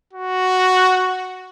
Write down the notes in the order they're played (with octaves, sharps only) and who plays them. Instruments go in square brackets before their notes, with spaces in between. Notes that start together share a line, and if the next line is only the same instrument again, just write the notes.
[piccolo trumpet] F#4